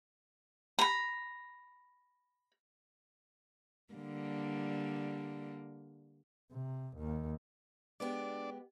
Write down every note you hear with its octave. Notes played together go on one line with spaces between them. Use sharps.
A#5 B5
D3 G3 A#3
C3
D#2
G#3 B3 D4 G4 D5